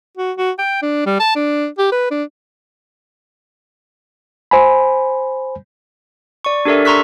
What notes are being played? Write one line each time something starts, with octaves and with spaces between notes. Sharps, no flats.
F#4
F#4
G5
D4
G3
A5
D4
G4
B4
D4
C5 G#5 B5
D5 C#6
D4 G4 A4 A#4 D5 E5
A#5 C6 C#6 E6 F#6 B6